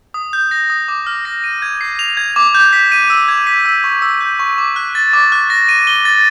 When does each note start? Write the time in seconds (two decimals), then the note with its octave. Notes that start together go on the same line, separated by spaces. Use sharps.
0.14 D#6
0.33 G6
0.51 A#6
0.70 D#6
0.88 D6
1.06 F6
1.25 A#6
1.44 D#7
1.62 G#6
1.81 C7
1.99 F7
2.17 G#6
2.36 D6
2.55 G6
2.73 B6
2.92 D#7
3.10 E6
3.28 G#6
3.47 B6
3.66 E6
3.84 C#6
4.02 E6
4.21 G6
4.39 C#6
4.58 D6
4.76 F#6
4.95 A6
5.13 D6
5.32 F#6
5.50 A#6
5.69 D#7
5.87 G7
6.05 A6